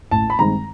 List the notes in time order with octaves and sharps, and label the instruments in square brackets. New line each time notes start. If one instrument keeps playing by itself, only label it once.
[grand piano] A1 [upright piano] A5
[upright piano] B5
[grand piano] G2 D#3 G#3 C4 [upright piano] A#5